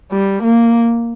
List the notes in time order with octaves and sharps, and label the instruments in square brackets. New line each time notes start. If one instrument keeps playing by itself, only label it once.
[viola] G3
A#3